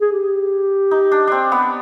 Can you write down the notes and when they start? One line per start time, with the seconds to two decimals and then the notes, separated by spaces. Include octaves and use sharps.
0.01 G#4
0.12 G4
0.91 D#4
1.12 D4
1.27 C4 D4
1.52 B3